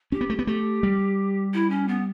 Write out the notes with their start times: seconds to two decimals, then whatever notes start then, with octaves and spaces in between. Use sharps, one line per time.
0.12 C#4 G4
0.21 B3
0.30 A3
0.39 B3
0.47 A3 G4
0.83 G3
1.54 E4
1.70 C#4
1.88 B3